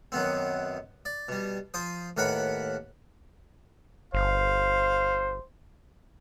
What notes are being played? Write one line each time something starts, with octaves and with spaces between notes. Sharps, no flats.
F#2 D#3 B3 C4
D5
B2 G3
F3 C5 D#6
D#2 A2 A#4 B4 F#5 B5
G1 C5 F5